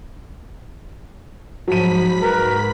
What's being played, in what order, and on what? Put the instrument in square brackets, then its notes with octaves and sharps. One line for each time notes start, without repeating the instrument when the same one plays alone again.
[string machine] G#2 B5 B6 [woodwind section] F3 [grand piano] F#3 D#7
[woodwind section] F#4 B4 [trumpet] A#4